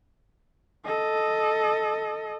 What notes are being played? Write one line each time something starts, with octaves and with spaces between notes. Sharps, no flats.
A4 D#5